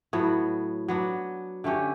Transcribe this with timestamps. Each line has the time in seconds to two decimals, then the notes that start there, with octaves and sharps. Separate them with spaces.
0.13 A2 F#3 B3
0.88 F#3 B3 D4
1.64 D3 A3 C#4 G4